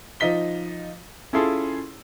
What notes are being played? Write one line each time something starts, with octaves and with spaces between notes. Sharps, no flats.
F3 D#4 F5 B6 G7
C#4 E4 F4 G#4 A4 C6